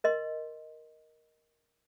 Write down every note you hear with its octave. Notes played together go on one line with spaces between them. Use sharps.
A#4 D#5 C6